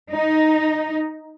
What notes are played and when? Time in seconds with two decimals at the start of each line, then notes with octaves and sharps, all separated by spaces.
0.12 D#4